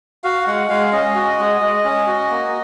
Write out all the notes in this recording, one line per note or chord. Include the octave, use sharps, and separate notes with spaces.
F#4 F5
G#3 F#5
G#3 F5
C#4 D#5
F#4
G#3
G#3
C#4
F#4
A#3